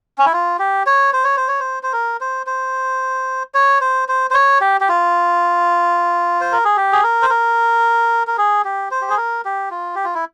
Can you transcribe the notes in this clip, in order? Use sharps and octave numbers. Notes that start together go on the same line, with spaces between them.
C#4
E4
F4
G4
C#5
C5
C#5
C5
C#5
C5
C5
A#4
C5
C5
C#5
C5
C5
C5
C#5
G4
G4
F4
C5
A#4
G#4
G4
G#4
A#4
C5
A#4
A#4
G#4
G4
C5
G4
G#4
A#4
G4
F4
G4
F4
E4